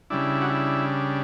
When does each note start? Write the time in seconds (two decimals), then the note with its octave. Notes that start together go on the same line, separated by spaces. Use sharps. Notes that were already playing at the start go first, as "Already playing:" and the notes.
0.10 C#3 G3 D4 E4
0.41 F#4
0.50 E4